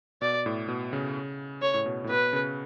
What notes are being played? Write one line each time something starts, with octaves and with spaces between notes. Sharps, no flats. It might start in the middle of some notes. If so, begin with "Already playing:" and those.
B2 D5
A2
B2
C#3
C#3 C#5
A2
B2
A2
B2 B4
C#3